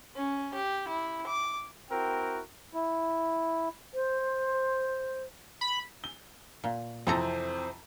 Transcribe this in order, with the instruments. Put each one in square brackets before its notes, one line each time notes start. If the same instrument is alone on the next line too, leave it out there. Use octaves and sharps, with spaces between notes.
[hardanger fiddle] C#4
G4
E4
D6
[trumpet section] C4 E4 F#4 A#4 G5
[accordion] E4
[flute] C5
[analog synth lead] B5
[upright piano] G7
[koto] A#2
[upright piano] F2 C3 E3 [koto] C4 A4 A#5 [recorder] C5